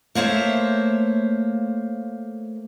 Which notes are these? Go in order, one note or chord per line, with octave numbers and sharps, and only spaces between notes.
A3 A#3 C5 C#5 E5